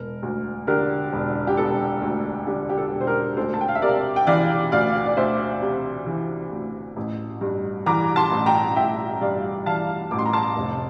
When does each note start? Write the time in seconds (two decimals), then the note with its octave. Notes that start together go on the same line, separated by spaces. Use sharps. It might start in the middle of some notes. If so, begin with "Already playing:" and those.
Already playing: E1 A#4
0.23 D2
0.67 D3 G4 A#4
1.13 E1
1.47 G4
1.57 E1 A4
2.02 D2
2.47 D3 G4
2.69 G4
2.77 A4
2.92 E1
3.01 C5
3.07 G4 A#4
3.37 D2 A4 C5
3.54 A5
3.61 G5
3.68 F5
3.75 E5
3.82 C3 A#4 D5
4.16 G5
4.27 E3 D5 F5
4.72 D2 D5 F5
5.06 D5
5.17 D2 C5 E5
5.62 C3
6.06 E3
6.51 D2
6.96 A1
7.41 G2
7.86 E3 A#5 D6
8.16 A5 C6
8.31 A1
8.46 G5 A#5
8.76 A1 E5 G5
9.21 G2 D5 F5
9.66 E3 F5 A5
10.11 A1 D6
10.18 C6
10.25 A#5
10.33 A5 C6
10.56 F1